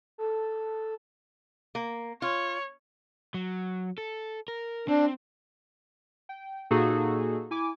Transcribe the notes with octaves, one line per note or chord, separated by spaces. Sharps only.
A4
A#3
F4 C#5
F#3
A4
A#4
C4 D4
G5
A#2 A#3 D#4 F#4 G#4 A4
E4 G#5 D6